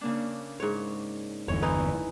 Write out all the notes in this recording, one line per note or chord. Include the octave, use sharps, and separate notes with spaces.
C#3 A#3 D4
G#2 C#5
G1 E2 D3 C#5
E3 D#4 E4